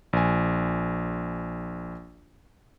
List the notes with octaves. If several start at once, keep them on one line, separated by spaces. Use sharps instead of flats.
A#1 G#5